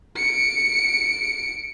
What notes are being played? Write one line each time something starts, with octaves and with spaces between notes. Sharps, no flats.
C#7 D7